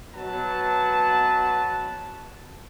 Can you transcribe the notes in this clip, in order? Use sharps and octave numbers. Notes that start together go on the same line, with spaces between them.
B2 F#3 B4 F#5 A5